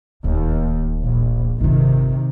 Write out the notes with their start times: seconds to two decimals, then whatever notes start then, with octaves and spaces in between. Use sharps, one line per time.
0.24 D1 D#2
1.02 A#1
1.61 G1 C3 D#3 F4